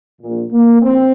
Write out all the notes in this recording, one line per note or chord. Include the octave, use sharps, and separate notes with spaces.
A#1 A#2
A#3
A#1 C4